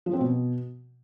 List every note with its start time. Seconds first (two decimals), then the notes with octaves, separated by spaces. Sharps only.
0.06 F3
0.13 C4
0.21 B2